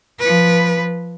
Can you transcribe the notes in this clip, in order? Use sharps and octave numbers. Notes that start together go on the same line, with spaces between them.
F3 B4